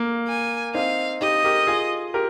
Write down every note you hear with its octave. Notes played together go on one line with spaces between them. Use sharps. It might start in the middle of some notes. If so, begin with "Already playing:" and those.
Already playing: A#3
G#5
C4 D#4 F5
D#4 G4 D#5
G4 A#4
F4 G#4
G4 A#4